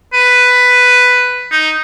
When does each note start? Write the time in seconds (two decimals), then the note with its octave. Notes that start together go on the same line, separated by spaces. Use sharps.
0.13 B4
1.51 D#4